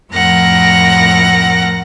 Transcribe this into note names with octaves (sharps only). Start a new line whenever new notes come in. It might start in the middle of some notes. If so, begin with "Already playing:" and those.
F2 A2 A#4 F#5 A#6